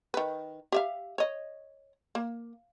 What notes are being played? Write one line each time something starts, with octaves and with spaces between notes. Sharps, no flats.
D#3 B4
G4 E5 F5
C#5 D#5
A#3